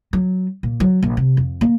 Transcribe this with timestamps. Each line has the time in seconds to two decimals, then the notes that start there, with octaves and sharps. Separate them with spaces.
0.13 F#3
0.63 A#2
0.80 F#3
1.03 A#1
1.17 C3
1.37 F2
1.61 A#3